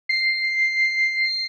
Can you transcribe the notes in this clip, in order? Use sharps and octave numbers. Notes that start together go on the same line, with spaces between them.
C7